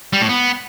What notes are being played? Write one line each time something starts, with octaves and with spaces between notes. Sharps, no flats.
G3
A2
B3